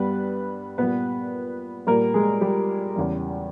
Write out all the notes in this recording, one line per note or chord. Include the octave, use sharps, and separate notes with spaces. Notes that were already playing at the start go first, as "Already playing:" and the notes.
Already playing: G2 G3 B3 B4
A#2 G3 B3 B4
A#2 G3 A#3 A#4
G#3 G#4
G3 G4
E2 C#3 E3 G3